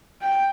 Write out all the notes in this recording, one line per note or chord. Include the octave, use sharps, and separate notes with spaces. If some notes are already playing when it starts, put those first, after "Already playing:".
G5